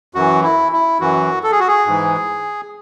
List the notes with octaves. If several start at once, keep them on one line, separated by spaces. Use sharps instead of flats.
F#2 E3 F#4
E4
E4
F#2 E3 F#4
A4
G#4
F#4
G#4
G#2 E3